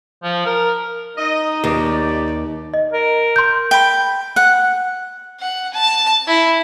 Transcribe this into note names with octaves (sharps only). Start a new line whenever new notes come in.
F3
A#4
D#4 D#5
D#2 G4 D5
D#5
A#4
C6 G6
G5 A5 B5
F#5
F#5
A5
E4